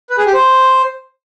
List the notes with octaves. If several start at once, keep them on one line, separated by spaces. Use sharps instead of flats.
B4
G#4
G4
C5